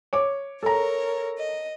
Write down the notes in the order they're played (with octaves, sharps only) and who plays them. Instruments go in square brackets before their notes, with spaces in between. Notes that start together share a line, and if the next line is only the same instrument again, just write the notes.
[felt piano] C#5 D6
[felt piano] A4 A#5 [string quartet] A#4 C#5
[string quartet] D#5